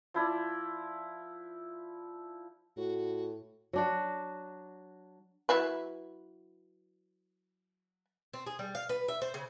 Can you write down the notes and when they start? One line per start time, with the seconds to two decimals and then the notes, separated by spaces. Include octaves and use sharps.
0.14 F3 E4 D5
2.77 A2 F#4
3.73 F#3 D4 F#4
5.49 F#3 E4 B4
8.34 C4
8.46 G#4
8.59 G3
8.75 F5
8.89 B4
9.08 E5
9.22 C5
9.34 C#3